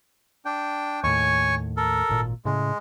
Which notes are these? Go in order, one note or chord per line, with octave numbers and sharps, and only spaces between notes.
D4 G5
D#2 A2 C#5 G#5 C#6
A4 A#4
G#1 A#2
A2 C#3 G#3